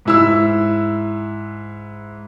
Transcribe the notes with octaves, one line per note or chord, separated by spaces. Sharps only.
G#2 E4 E6